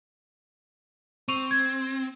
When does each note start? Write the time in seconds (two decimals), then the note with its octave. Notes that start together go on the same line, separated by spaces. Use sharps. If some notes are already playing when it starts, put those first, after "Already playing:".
1.29 C4 C#6 D#7 F7
1.51 G#6